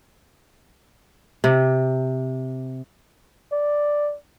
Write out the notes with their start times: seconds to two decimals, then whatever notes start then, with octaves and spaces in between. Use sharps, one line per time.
1.44 C3
3.52 D5